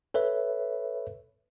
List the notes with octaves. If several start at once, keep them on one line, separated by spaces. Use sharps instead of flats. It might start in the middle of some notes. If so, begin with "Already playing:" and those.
A4 B4 C#5 E5